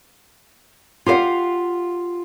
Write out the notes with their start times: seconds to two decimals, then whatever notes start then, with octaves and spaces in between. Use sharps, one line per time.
1.06 F4 G4 B4 F5 F#5